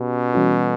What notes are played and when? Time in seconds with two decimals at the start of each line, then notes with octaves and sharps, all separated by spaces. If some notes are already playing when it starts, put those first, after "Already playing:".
Already playing: B2 C#4 G4
0.33 E3 G3 C#4 F#4 A4